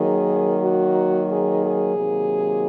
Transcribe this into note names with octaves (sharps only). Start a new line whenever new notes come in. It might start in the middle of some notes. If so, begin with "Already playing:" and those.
Already playing: D#3 F#3 A#3 G#4
F#4
G#4
G#4
C3 D#3 F#3 A#3